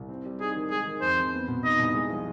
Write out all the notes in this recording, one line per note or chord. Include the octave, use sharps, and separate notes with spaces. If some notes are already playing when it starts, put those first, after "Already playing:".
Already playing: C2
C4
G3
D#4 G#4
D#3
G#3 G#4
D#3
F2 C5
F2
B3
B2
D#4 D#5
C2
G#3
F3